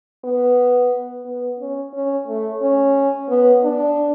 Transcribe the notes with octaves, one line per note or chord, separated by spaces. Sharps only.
B3
B3
C#4
C#4
A3
C#4
B3
D4